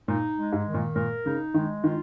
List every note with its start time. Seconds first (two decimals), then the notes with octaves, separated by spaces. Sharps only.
0.08 A#2 D#4
0.38 G#3
0.53 G#2
0.66 D#3
0.74 A#2
0.96 A#2 A#4
1.26 C#3 D#4
1.54 D#3 G#3
1.84 D#3 F4